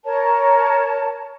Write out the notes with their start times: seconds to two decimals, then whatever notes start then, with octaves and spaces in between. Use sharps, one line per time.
0.05 A#4 C#5 A5